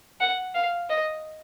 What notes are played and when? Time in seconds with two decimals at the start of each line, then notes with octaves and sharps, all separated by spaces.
0.20 F#5
0.55 F5
0.90 D#5